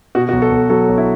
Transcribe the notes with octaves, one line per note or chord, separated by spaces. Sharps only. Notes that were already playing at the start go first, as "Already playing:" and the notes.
B2 F#4
F#4
B1
A4
B1
F#3 A4
B1
E4